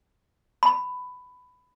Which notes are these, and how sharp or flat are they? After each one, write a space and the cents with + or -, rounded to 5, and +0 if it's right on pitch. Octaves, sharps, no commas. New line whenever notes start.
B5 +15